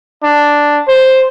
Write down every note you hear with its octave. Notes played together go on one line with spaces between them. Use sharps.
D4
C5